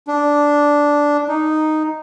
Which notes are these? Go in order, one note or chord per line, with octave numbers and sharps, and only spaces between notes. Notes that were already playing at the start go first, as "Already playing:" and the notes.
D4
D#4